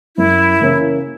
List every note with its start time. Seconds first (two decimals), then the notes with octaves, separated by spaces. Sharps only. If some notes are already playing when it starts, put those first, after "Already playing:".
0.17 F#2 E4
0.60 C#3 E3 A#3 C#4